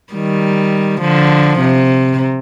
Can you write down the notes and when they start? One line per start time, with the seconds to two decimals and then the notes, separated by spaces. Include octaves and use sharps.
0.14 D#3 G3
1.01 D3 F3
1.60 C3